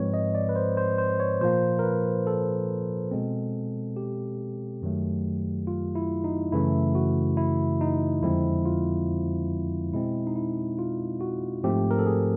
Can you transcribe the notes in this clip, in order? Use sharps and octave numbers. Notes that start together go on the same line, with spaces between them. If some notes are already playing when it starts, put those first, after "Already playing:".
Already playing: G#2 F3 G#3 C4 B4 C#5
D#5
D5
B4
C5
C5
C5
C#5
A#2 F3 A#3 C5
A#4
B4
A4
B2 G#3 C4
G4
F#2 D#3 F#3 A3
F4
E4
D#4
F#2 C#3 E3 A3 E4
F#4
E4
D#4
F2 D3 F3 G#3 C4 E4
F4
B2 G#3 C4 E4
D#4
E4
F4
F#4
G#2 F3 A3 C4 G4
A#4
A4
G#4